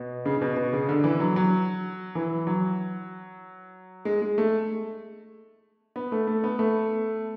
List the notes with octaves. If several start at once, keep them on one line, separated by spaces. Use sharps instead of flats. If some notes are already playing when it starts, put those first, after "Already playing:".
Already playing: B2
C#3
C#3
B2
B2
C#3
D3
E3
F#3
F#3
E3
F#3
G#3
G#3
A3
B3
A3
A3
B3
A3